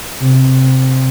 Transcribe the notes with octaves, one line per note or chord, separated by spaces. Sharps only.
C3